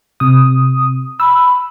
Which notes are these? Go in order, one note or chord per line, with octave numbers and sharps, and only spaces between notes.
C3 D#6
B5 E6